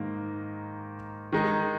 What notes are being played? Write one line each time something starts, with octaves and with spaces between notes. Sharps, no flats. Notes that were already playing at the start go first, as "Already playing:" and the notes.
Already playing: G#2 D#3 A#3
D#3 G#3 D#4